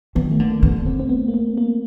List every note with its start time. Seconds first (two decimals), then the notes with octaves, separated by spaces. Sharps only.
0.15 D#3 B3
0.31 A3
0.40 D3 A#3
0.63 D3 B3
0.86 C4
1.00 C4
1.09 B3
1.28 A#3
1.34 B3
1.58 A#3